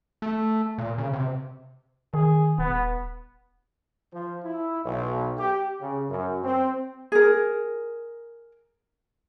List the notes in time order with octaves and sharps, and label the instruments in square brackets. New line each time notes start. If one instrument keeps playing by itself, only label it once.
[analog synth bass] A3
A#2
C#3
C3
[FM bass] D#3 [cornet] G#4
[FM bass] D#1 [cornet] B3
[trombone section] F3
E4
B1
G4
C#3
F#2
C4
[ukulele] G#4 A#4